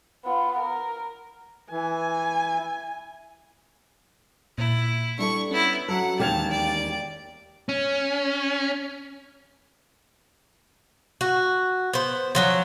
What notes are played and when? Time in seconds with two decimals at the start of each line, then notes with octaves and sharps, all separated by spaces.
0.24 B3 F4
0.58 A#4
1.71 E3 G#5
4.58 A#2 E4
5.19 G3 D4 E4 A4 C#6
5.51 B3 C#4 E4
5.88 F#3 A4 F#5
6.19 E1 D#2 G4 F5 G5 A5 G#6 F7
6.50 D5
7.69 C#4
11.21 F#4
11.93 B3 C5
12.35 F3 F#3 C#4